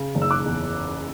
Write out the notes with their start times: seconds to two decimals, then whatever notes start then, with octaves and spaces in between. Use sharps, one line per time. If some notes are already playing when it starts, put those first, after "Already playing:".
Already playing: C#3
0.15 F#1
0.22 E6
0.31 D6 F#6
0.46 E2